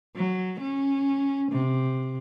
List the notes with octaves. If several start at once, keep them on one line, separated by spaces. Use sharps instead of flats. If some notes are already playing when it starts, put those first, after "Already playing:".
F#3
C#4
C3